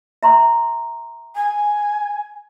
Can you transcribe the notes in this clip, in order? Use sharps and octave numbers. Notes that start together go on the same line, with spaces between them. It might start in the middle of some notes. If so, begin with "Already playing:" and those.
E5 A#5 C6
G#5